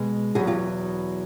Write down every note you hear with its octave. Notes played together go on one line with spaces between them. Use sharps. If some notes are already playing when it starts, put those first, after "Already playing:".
Already playing: B2 G#3
E2 B2 F#3 F#4 G#4
F4 G4